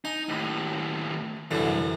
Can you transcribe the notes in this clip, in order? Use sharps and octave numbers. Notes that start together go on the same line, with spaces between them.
D#4 G#5
D#2 A2
C2 F#2 D3 E3